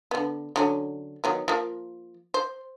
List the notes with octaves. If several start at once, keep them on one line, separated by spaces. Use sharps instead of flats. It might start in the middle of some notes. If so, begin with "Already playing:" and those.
D3 B3
D3 F#3 C#4
D#3 F#3 B3
F3 A#3
C5